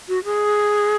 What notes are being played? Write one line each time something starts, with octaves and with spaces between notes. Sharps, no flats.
F#4
G#4